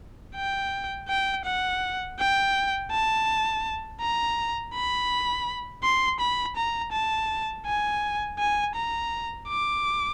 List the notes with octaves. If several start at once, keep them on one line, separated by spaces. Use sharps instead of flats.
G5
G5
F#5
G5
A5
A#5
B5
C6
B5
A#5
A5
G#5
G#5
A#5
D6